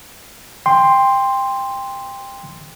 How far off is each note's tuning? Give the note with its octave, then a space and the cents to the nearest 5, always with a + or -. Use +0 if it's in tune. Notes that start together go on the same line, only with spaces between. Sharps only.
G5 +20 C6 +0